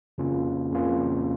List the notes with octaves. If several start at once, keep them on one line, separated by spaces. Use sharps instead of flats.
F2 C#3 A#3 C#4 F4
F2 C#3 A#3 C#4 F4